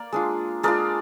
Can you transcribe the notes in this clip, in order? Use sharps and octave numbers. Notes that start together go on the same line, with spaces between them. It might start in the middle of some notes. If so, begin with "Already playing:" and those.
Already playing: A#3 A#4 D5
G#3 D4 F4
G#3 D4 F4 A#4 D5